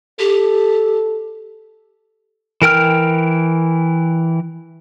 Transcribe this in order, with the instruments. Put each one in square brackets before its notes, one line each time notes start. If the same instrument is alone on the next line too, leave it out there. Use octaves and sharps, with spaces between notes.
[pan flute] G4 [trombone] A4
[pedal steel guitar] E3 A#4 G5 F6